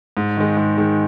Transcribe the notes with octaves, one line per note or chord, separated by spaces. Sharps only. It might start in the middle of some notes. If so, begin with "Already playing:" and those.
G#2
D#3 G#3
G#2
D#3 G#3